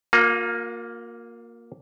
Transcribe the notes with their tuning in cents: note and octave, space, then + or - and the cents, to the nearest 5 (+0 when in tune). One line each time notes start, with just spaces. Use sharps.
A#3 +0 F4 +45